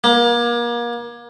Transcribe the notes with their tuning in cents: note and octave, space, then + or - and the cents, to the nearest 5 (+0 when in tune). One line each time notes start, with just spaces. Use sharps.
A#3 +35